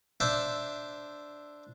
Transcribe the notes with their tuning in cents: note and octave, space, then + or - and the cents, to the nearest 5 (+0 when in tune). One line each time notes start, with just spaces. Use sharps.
D4 +0 C5 -10 E5 +0